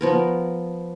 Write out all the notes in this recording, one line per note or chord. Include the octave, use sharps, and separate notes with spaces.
F3 B3 A#4